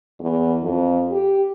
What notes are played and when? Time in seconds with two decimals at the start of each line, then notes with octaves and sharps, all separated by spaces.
0.20 E2
0.63 F2
1.11 G4